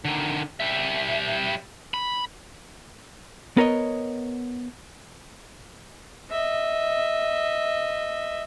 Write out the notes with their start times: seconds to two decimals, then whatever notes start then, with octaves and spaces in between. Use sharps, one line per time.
0.05 D3 D#3
0.60 G3 E5
1.94 B5
3.57 B3 A#4 C#5 D#5
6.30 D#5 E5